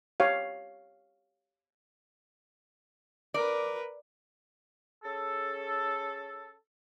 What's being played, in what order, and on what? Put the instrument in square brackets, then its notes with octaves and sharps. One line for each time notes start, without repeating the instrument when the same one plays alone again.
[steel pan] G4 C#5 F5
[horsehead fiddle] A#4 B4 [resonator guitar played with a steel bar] D5
[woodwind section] C#4 G#4 A4